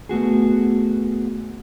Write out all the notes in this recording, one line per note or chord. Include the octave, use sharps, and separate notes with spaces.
A3 B3 F#4 G#4